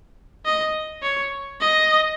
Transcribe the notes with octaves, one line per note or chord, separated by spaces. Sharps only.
D#5
C#5
D#5